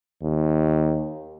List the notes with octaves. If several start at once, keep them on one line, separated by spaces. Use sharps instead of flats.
D#2